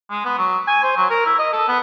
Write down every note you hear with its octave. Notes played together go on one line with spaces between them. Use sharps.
G#3
B3
F#3
G#5
C5
F#3
A#4
E4
D#5
A4
B3